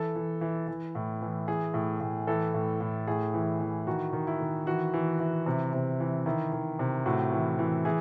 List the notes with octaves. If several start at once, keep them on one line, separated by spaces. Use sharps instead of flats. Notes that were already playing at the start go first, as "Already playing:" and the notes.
Already playing: E3 A4
E3
E3
E3
A2
E3
E3 G#4
A2
A2
E3 A4
A2
A2
A2 G#4
E3
E3
D#3 F#4
D#3
E4
D#3
E3 F#4
E3
E3
C3
C3
E3
D#3 E4
D#3
C3
A2 F#4
E3
E3
E3 G#4